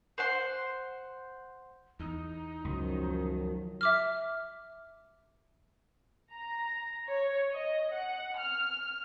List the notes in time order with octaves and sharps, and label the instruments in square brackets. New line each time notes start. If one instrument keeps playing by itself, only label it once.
[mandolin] C5 F#5 C6
[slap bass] E2 [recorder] D#4
[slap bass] C#2 [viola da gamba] F#2 D#3 F3 [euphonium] F#3
[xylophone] E5 D6 F6
[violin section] A#5
C#5
D#5
F#5
F6